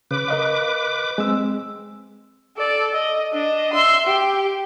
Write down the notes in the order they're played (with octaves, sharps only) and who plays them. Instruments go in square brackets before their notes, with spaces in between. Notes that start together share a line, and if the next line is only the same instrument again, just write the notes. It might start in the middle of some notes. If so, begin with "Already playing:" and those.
[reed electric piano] C#3 [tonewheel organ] B4 D6
[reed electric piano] A#4 D#5 F5
G#3 C4 E6
[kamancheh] A4 D5
D#5
D4 D#5
E5 C6
G4